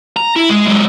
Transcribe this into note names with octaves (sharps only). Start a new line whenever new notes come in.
A#5
E4
G#3
F#3 G#3